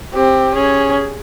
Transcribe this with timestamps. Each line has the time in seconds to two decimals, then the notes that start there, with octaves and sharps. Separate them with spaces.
0.14 C4 G4
0.55 C#4 G#4